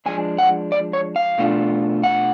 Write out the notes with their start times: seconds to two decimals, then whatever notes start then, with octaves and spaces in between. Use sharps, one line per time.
0.06 F3 G#3 D4 G#5
0.38 F#5
0.72 D5
0.93 C#5
1.16 F5
1.38 B2 A3 D4 F4
2.03 F#5